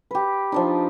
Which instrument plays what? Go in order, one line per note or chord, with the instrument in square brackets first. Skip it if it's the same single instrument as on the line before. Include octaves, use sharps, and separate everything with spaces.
[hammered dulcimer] G4 B4
F3 D4 D#4